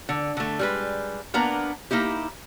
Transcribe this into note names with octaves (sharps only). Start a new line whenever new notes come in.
D3
D3 A3
G3 G#3 B4
A#3 B3 D4 A#4 A#5
A#3 D#4 E4 G4